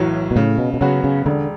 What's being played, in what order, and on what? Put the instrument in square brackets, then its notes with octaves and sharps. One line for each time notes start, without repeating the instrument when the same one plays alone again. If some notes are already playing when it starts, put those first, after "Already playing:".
Already playing: [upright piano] B1 A2 F#3 [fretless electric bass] E3
[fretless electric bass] B2
[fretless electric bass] A2 [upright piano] C#3
[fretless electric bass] B2
B2
[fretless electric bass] C#3 [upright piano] F#3 B3 F#4
[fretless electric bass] C#3
[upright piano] E1 [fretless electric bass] D3